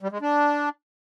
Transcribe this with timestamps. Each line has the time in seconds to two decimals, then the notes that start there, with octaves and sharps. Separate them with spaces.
0.02 G3
0.12 G#3
0.21 D4